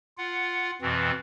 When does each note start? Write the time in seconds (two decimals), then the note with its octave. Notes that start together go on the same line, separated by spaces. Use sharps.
0.18 F4 F#5
0.82 F2 B2 E3 C4